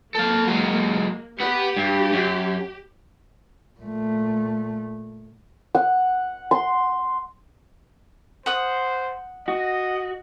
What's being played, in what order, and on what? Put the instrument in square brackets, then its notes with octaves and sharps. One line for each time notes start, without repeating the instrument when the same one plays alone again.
[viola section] A#3 [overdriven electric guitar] A4 F5
[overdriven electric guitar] F#3 G#3
[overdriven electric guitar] B3 F#5 [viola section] G4
[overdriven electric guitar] G2
F#2
[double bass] A#2 A3
[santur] F#5
C6
[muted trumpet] C5 [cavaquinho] F#5 D#6
[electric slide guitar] F#4 [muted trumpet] D#5